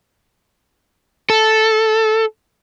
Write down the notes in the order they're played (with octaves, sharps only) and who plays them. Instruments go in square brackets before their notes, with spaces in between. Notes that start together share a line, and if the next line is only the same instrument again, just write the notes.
[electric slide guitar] A4